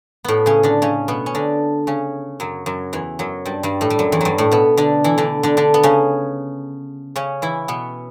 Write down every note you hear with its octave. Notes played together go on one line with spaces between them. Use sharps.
A2 A3 B3
C#3 C#4
D3 D4
C#3 C#4
B2 B3
C#4
D3 D4
C#3 C#4
F#2 F#3
F#2 F#3
E2 E3
F#2 F#3
G2 G3
G2 G3
A2 A3
G3
F#2 F#3
E2 E3
G2 F#3 G3
A2 A3
B2 B3
D3 D4
E3 E4
D3 D4
D3 D4
D3 D4
B3
C#3 C#4
C#3 C#4
E3 E4
B2 B3